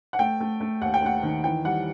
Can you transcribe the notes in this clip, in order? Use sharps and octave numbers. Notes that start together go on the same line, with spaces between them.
F#5
A3 G5
A3
A3
D#2 F#5
G5
A3 F#5
D#3
E3 G5
G3 F#5